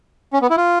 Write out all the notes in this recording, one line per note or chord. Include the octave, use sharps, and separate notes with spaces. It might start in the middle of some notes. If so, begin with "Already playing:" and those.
C#4
B3
E4
F4